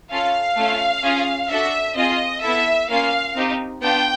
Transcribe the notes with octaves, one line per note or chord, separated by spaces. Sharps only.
C#4 F4 A4 F5
A3 C#4 F4
C#4 F4 G#4
D4 F#4 A4 E5
C4 F4 G#4 D#5
B3 E4 A4 E5
A#3 C#4 F4 F5
C4 D#4 G4
B3 D4 F4 G5